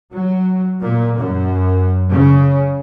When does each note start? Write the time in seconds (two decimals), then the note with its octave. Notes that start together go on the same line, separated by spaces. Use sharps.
0.12 F#3
0.80 A#2
1.16 F#2
2.11 C#3